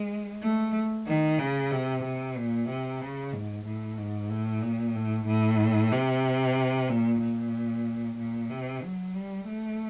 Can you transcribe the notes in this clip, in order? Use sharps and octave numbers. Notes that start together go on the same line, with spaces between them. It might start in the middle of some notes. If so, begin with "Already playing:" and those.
Already playing: G#3
A3
D#3
C#3
C3
C3
A#2
C3
C#3
G#2
A2
G#2
A2
A#2
A2
A2
C3
A#2
A#2
A#2
C3
F#3
G3
A3